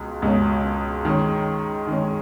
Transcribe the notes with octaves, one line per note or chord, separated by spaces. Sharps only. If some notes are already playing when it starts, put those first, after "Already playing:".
Already playing: C#2 B2 G#3
C#2 B2 G#3 C#4
D#3 G#3 C#4
D#3 G#3 C#4